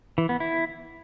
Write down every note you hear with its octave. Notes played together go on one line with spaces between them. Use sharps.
E3
B3
E4